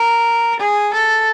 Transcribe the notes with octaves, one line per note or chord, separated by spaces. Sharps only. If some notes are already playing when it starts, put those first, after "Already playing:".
Already playing: A#4
G#4
A4